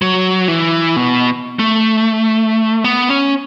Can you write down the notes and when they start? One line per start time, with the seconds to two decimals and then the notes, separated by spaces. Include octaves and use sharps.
0.02 F#3
0.48 E3
0.96 B2
1.59 A3
2.84 B3
3.09 C#4